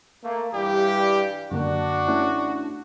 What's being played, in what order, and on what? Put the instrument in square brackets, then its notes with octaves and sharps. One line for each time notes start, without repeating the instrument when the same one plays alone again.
[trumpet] A3 [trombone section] A#3
[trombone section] G2 E3 G3 [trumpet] G4
[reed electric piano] F#2 D3 A#3 [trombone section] D4 [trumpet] F#4
[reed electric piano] A3 C#4 E4